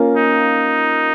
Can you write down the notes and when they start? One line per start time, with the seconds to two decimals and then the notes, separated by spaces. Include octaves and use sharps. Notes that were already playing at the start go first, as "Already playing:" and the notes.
Already playing: A#3 C#4 F4
0.16 D#4